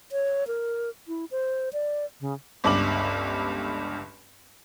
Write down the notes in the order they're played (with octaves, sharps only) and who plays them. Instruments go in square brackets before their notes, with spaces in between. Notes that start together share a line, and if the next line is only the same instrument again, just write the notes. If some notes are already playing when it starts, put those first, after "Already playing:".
[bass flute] C#5
A#4
E4
C5
D5
C#3
[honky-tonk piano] G1 C#2 G2 D6 F#7